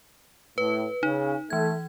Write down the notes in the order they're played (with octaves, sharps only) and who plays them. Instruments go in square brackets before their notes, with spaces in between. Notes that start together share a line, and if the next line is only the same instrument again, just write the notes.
[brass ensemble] A2 [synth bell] B4
[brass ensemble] C#3 [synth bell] D#4
[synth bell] E3 G#6 [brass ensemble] A3